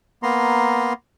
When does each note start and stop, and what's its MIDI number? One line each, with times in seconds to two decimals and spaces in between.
0.23 0.93 58
0.23 0.93 59
0.23 0.93 82
0.23 0.93 84